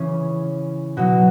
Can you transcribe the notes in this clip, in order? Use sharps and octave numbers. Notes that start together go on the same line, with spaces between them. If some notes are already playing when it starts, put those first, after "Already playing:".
Already playing: C#3 E3 C#4
B2 F#3 F#4